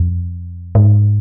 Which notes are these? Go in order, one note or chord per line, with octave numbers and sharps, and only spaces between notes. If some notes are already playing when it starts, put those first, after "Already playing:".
Already playing: F2
G#2